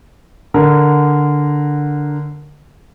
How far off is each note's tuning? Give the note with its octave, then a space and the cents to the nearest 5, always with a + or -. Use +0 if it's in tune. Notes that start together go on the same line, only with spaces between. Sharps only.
D3 +0 A#4 +0